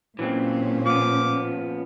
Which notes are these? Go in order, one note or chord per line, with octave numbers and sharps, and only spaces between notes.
A#2 E3 F#3 C4 C#4
F3 B3 D6